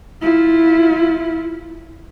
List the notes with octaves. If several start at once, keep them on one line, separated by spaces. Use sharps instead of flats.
E4 F4